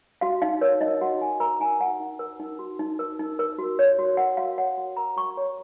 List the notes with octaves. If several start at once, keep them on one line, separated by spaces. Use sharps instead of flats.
F#4 F5
D#4 F5
A#4 C#5
D#4 D#5
F#4 F#5
D#4 G#5
A#4 A#5
D#4 G#5
F#4 F#5
D#4
A#4
D#4
F#4
D#4
A#4
D#4
A#4
F#4
C#5
F#4
A#4 F#5
F#4 F5
C#5 F#5
F#4
A#4 A#5
F#4 C#6
C#5 C#6